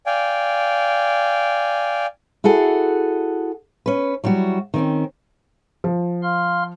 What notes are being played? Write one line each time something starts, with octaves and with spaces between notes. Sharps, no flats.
D5 F5 G5 G#5
E4 F#4 G#4 A4 F#5
C#4 B4
F#3 G3 E4 F#4
D#3 C4 C#4
F3
F5 C6 F6